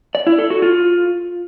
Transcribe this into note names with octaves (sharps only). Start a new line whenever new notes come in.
D5
E4
A4
F#4
F4